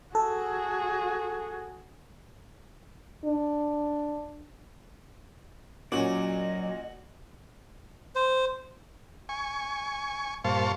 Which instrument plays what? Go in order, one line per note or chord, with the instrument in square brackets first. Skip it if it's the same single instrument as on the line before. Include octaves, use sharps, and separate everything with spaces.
[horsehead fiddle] F#4 G#4 [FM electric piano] A4
[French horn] D4
[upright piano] A#2 C#4 [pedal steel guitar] F#3 D5 [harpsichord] F#4 [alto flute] D#5
[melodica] C5
[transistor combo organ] G#5 C#6
G2 A#2 C5 F5 A5 C#6